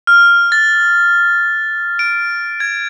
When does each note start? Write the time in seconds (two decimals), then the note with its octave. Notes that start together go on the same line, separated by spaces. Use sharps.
0.07 F6
0.52 A6
1.99 D7
2.60 G#6